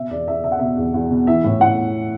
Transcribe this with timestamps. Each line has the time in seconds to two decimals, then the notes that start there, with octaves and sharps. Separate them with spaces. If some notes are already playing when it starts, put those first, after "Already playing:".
Already playing: B2 E5
0.10 E2 D5
0.27 E2 E5
0.44 B2 E5
0.52 F#5
0.59 B2 E5
0.77 E2
0.94 E2
1.11 B2
1.27 E3 E5
1.44 A2
1.60 A2 F#5